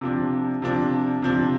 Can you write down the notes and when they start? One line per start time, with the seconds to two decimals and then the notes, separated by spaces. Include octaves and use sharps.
0.01 C3 F3 D4
0.62 C3 F3 D4
1.22 C3 F3 D4